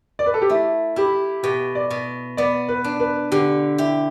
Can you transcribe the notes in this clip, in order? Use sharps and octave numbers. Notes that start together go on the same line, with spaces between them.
D5
B4
A4
G4
A3 E4
E4 G4
B2 G4
D5
B2
B3 D5
B4
D4
B4
D3 G4
E4 G4